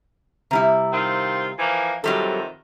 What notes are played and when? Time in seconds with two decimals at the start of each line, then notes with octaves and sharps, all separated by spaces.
0.51 C3 G3 E4
0.93 D#3 C4 F4
1.59 E3 F3 A#3
2.04 F2 C3 D#3 F#3 G3 A4